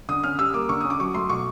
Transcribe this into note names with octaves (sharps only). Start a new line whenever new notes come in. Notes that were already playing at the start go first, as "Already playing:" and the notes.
D3 D#6
C#4 F6
G3 E6
A#3 D6
D3 C#6
C#4 D#6
D6
F#3 C#6
A3 C6
B2 C#6